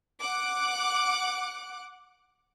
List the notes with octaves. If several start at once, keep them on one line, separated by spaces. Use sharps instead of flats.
F#5 D6 F#6